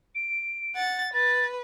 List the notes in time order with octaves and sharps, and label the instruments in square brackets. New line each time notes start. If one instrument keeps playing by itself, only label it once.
[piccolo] D7
[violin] F#5 A6
[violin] B4 [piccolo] A6